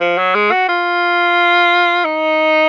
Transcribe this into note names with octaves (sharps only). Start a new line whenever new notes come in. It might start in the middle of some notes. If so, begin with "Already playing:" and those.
F3
F#3
G#3
F#4
F4
D#4